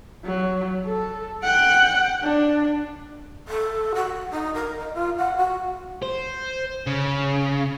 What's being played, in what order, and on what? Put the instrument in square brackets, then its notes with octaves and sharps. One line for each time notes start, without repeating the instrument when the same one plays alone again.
[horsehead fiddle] F#3
A4
F#5 G5
D4
[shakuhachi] A4
F#4
D#4
A#4
D#5
F4
F#5
F#4
[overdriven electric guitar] C5
C#3